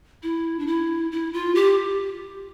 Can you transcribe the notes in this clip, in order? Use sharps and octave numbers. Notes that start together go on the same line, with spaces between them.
E4
D4
E4
E4
F4
G4